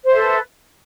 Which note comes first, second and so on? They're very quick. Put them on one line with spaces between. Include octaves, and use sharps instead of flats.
C5 E5 A4 B4